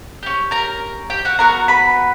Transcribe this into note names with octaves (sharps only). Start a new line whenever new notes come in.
C#4 G4
A#4 A#5
G4 G5
F#4 F#5
B3 F#4 A#4 A#5
B4 B5